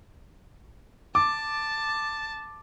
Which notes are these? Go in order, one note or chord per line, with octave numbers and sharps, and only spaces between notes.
A5 D6